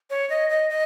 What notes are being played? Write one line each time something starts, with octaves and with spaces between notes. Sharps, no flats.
C#5
D#5
D#5
D#5